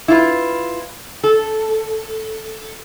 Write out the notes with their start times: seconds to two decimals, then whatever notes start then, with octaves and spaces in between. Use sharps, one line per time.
0.08 E4 F4 B4
1.23 A4